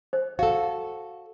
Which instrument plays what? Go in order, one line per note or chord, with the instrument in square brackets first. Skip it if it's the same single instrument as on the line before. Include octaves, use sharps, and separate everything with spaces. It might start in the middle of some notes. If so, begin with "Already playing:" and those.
[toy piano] C5
[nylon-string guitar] F#4 A4 [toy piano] F5